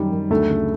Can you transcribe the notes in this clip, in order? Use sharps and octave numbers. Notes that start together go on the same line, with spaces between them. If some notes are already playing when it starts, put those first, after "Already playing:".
Already playing: F#2 D#3 G3
F#2
D2 A3
C#3